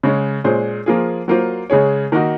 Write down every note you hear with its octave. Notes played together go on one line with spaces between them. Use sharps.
C#3 G#3 C#4
A#2 G#3 C#4 G#4 C5
F3 A#3 F4 G#4
F#3 A#3 F4 C5
C#3 G#3 C#4 G#4 C#5
D#3 A#3 D#4 F#4